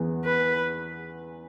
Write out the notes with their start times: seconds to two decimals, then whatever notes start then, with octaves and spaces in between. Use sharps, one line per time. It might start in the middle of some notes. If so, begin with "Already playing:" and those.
Already playing: E2 E3 B3 G#4
0.25 B4